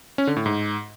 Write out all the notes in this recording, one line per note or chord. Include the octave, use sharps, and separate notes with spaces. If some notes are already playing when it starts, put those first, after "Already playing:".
C#4
D3
A2
G#2